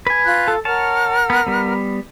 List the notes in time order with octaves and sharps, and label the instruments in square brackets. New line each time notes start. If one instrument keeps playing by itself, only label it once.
[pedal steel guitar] B4 G#5
[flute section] F4 F#6
[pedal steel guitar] A4
[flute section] A#4 F#5 F6 [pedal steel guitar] C#5 A5
[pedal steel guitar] B3
G3 B3